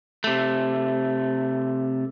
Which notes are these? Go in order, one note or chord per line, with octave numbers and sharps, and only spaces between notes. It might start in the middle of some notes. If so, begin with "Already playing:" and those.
C3 A3